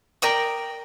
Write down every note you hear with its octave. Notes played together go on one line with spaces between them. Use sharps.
A#4 D5 G5 D#6